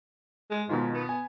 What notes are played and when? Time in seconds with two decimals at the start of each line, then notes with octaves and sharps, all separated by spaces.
0.51 G#3
0.69 G#2 B2 D#3 F4
0.94 B3
1.09 G#5